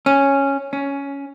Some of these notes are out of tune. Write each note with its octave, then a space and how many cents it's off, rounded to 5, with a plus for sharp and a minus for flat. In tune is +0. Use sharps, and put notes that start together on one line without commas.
C#4 -5
C#4 +10